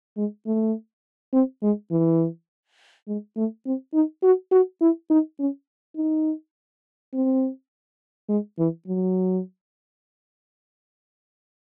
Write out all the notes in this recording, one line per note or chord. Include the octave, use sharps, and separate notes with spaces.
G#3
A3
C4
G#3
E3
G#3
A3
C4
D#4
F#4
F#4
E4
D#4
C#4
D#4
C4
G#3
E3
F#3